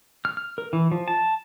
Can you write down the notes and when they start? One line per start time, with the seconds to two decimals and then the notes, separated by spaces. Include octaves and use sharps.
0.25 F6
0.37 F6
0.58 A#4
0.73 E3
0.92 F3
1.08 A5